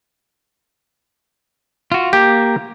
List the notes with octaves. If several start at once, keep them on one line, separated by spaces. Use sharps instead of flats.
F4 F#4
A#3 G4